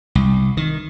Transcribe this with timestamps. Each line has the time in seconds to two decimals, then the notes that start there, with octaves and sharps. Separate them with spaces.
0.15 C2
0.57 D#3